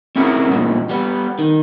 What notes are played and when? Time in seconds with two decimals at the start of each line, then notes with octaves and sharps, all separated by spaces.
0.16 C4 C#4 E4 F#4 G#4 A#4
0.48 E2 G2 A#2 G#3
0.89 G3 B3
1.39 D#3